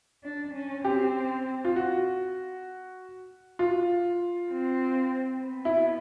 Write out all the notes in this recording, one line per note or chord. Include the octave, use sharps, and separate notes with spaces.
D4
C#4
C4 G4
F4
F#4
F4
C4
B3
E4